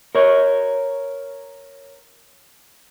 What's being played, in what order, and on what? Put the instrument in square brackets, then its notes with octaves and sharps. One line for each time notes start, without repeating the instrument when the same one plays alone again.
[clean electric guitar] A#4 C#5